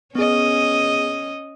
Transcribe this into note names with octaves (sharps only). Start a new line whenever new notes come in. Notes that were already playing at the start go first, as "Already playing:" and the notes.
B3 C#4 G#4 D#5